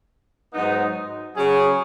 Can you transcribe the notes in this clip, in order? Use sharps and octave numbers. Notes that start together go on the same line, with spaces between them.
G#2 F#3 B3 D#4
C#3 F#3 C#4 G#4